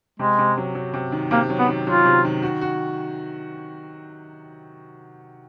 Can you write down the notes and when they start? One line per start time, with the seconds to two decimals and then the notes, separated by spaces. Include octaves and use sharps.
0.19 C3 G#3
0.39 C3
0.58 F#3
0.75 F#3
0.94 C3
1.12 D#3
1.31 C3 A#3
1.50 F#3
1.59 B3
1.68 D#3
1.87 F#3 F4
2.06 C3
2.25 D#3
2.42 F#4
2.61 F#4